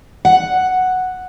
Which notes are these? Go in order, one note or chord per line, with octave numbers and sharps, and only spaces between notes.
F#5